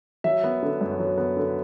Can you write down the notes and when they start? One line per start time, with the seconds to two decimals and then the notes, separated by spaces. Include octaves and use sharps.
0.24 F#3 E5
0.44 B3
0.63 D3
0.81 F#2
0.99 F#3
1.18 B3
1.37 D3